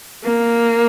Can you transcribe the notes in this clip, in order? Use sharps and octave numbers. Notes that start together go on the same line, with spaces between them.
A#3